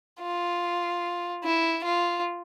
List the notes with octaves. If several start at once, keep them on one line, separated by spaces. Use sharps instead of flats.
F4
E4
F4